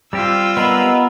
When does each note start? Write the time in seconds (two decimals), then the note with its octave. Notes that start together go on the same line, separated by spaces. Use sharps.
0.13 G3 C4 F4 G4 E6
0.57 B3 A#4 B4 D#5